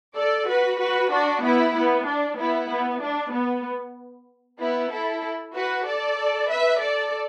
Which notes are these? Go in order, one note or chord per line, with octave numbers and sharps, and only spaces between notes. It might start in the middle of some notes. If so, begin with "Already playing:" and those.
A4 D5
F#4 B4
F#4 B4
D4 F#4
B3 E4
B3
D4
B3 E4
B3
D4
B3
B3 E4
E4 A4
F#4 B4
A4 D5
B4 E5
A4 D5